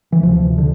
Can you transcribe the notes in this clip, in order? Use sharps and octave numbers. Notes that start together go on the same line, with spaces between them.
E3
D2 C3 F3
D3